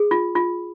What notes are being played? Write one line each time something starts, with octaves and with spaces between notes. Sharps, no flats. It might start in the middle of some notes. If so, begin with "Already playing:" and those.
Already playing: G#4
F4
F4